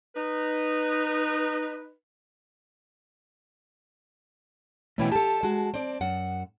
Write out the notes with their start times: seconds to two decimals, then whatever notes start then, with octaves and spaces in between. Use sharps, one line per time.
0.15 D#4 B4
4.98 B2 E3 A3 C#4 E4 G5
5.12 G4 A4 A5
5.43 G#3 F#4
5.74 C4 D5
6.01 F#2 F#5